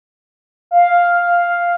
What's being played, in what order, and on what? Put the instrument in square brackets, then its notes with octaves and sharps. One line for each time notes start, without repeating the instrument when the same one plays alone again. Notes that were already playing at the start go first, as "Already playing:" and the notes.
[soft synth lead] F5